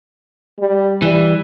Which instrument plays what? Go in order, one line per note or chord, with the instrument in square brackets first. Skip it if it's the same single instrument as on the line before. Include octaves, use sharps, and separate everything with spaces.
[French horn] G3
[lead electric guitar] E3 [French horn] G3